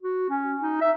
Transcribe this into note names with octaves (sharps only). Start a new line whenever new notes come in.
F#4
C#4
D#4
E5